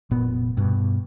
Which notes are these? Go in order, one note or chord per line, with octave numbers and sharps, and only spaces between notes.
F1 A#2 B3
G2 B2